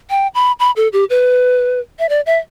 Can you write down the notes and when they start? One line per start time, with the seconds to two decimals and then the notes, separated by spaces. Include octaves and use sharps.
0.10 G5
0.35 B5
0.60 B5
0.76 A4
0.93 G4
1.10 B4
1.99 E5
2.09 D5
2.26 E5